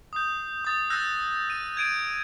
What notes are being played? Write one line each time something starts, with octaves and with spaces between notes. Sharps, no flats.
D#6 G6
D#6 A6
E6 F#6 G6 A#6
D#7
G#6 D7 D#7